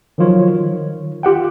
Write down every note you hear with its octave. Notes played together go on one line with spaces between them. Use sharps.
D#3 F3 F#3 F4 C#5
D#3
F4 G4 F#5 G5